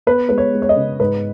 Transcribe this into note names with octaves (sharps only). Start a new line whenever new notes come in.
B3 B4
G#3 B4
C#5
G#3
C#5
D#5
C#3
G#2 B4